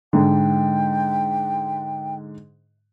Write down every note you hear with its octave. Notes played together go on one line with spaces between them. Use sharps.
G#2 D3 G5